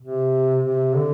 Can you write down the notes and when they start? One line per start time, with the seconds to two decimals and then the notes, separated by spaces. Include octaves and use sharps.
0.01 C3
0.65 C3
0.96 D3